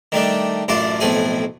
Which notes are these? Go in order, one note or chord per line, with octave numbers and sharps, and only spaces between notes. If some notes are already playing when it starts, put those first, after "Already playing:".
D#3 G3 A3 D4
A1 F#2 D4 F4 D5
B1 F2 A2 A3 G#4 G#5